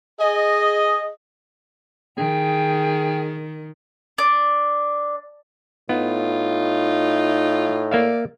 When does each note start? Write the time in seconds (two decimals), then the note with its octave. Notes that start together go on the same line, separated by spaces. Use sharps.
0.20 G#4 D#5
2.18 D#3 G#4 G5
4.18 D4
5.89 A2 B3 D#4 F4
7.91 A#3 D5 E5 F5